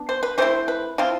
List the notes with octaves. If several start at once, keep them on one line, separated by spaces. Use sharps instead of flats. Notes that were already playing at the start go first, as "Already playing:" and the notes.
Already playing: B3 D4
C5
B4
E3 A3 C4 E4 C5
B4
F3 C4 E4 F4